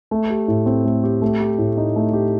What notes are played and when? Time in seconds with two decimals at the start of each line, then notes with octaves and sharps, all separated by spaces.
0.11 A3
0.30 G4
0.48 A2
0.66 C4
0.85 A3
1.04 G4
1.22 A3
1.40 G4
1.58 A2
1.77 D#4
1.96 A3
2.13 G4